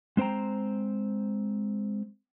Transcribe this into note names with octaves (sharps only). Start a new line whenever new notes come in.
G#3 C4 C5 G5 A#5